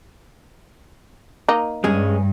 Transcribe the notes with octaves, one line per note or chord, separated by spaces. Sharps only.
A#3 D#4
G2 G#3 C#4 G#4